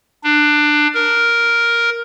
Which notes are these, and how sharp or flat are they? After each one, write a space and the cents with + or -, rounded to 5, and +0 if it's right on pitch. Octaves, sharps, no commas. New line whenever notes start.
D4 +20
A#4 +5